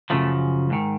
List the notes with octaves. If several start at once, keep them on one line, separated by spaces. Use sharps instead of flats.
F#2 C#3 F3 A3
G#2 D#3